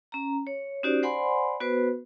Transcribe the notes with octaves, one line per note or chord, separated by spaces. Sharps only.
C#4 A#5
C#5
C#4 D#4 F#4 G4 C5 D5
C5 D5 F#5 G#5 B5 C6
B3 F#4 B4 C5